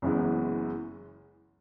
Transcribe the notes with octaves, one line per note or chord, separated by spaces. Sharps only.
F#1 F#2 E3 G#3 B3